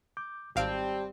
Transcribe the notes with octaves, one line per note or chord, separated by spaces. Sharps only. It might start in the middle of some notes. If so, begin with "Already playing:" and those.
D6 G6
G#1 G3 C4 G4 F5 G5 A5 D7